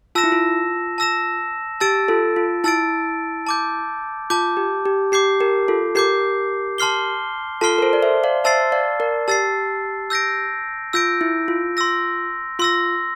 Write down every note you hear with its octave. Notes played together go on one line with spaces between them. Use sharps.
F4 A5 E6 A#6 E7
E4
F4
A5 E6 A#6 E7
G4 A5 E6 A6 D7
F4 A4
F4
E4 A5 E6 A6 D7
A5 D6 G6
F4 A5 D6 G6
G4
G4
G4 D6 G6 C7
G4 A#4
F4 A4
G4 A#4 D6 G6 C7
A5 C6 F6 C7 G7
F4 A4 A5 C6 F6 C7 G7
A#4
A4 C5
D5
C5 E5
D5 F5
C5 E5 A5 E6 A6 C7
D5 F5
A#4 D5
G4 A5 E6 A6 C7
E6 G6 A#6 D7
F4 E6 G6 A#6 D7
E4
F4
C6 E6 A#6
F4 C6 E6 A#6